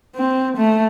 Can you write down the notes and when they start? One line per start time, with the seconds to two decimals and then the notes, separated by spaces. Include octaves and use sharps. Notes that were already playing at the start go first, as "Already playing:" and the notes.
0.16 C4
0.57 A3